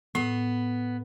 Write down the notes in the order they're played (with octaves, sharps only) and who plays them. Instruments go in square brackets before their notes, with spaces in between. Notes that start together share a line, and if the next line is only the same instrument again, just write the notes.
[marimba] A2 [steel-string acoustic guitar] B3